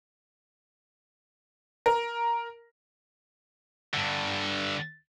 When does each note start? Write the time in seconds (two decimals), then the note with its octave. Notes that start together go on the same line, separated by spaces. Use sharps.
1.86 A#4
3.94 G2 D3